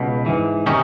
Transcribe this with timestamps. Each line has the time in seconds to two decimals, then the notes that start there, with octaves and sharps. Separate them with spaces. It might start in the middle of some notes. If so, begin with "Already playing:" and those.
Already playing: C#2 B2
0.26 G#2 E3
0.66 C3 D#3 C#4 D#4